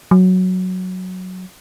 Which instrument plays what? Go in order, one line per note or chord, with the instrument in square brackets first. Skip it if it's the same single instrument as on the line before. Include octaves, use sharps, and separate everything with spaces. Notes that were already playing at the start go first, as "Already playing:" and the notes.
[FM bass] F#3